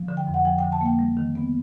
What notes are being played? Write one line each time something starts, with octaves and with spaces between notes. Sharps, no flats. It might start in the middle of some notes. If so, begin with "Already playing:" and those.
Already playing: F3
D3
G5
F2
F#5
F3 G5
G5
D3
A5
A#3 G5
G3
D#3
B3